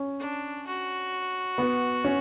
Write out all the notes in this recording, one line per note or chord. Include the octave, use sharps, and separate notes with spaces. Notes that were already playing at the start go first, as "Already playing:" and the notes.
Already playing: C#4
D4
F#4
B3
C#4